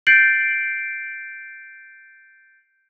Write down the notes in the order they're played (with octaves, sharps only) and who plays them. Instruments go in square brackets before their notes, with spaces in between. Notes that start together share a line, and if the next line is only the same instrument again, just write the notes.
[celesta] G6 A6 C7 D7 F#7